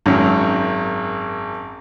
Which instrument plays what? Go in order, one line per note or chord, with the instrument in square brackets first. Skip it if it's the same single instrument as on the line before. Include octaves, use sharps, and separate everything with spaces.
[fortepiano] G#1 F#2 F#3